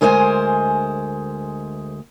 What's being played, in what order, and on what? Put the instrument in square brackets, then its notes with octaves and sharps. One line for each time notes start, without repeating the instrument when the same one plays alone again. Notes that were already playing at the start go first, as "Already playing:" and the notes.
[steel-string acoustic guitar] D2 G#3 A#4 C5 E5 G#5